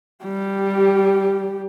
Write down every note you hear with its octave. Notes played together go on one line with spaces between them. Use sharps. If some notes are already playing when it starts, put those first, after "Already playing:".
G3 G4